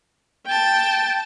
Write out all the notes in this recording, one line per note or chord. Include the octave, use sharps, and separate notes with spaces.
G5 A5